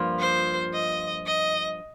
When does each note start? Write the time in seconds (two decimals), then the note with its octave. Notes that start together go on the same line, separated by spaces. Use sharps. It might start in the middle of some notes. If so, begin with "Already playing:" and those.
Already playing: G2 F3 A#3 F4
0.20 C5
0.74 D#5
1.26 D#5